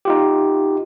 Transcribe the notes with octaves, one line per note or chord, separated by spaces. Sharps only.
D#4 F4 G4